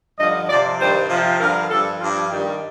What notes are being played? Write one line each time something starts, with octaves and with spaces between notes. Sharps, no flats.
G2 D3 F3 D#5
C3 F3 D5
G2 D#3 G3 C5
C3 F3
G2 D3 F3 A#4
G2 F3 A4
G2 F3 F4
G2 D#3 G3 G4